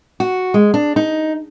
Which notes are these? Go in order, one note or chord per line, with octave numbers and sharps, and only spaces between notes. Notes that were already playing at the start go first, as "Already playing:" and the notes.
F#4
G#3
D4
D#4